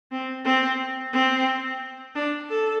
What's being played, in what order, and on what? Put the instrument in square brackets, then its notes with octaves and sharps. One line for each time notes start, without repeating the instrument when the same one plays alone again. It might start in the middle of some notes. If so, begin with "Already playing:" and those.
[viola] C4
C4
C4
D4
A4